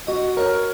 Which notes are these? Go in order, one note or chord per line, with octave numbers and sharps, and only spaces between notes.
F#4 D#5
A#4 C#5